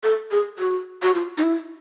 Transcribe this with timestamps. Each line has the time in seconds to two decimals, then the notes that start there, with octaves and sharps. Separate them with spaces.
0.03 A4
0.31 G#4
0.59 F#4
1.03 F#4
1.15 F4
1.38 D#4
1.43 E4